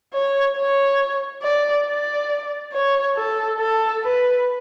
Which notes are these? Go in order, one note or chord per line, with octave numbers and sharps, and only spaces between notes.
C#5
C#5
D5
D5
C#5
A4
A4
B4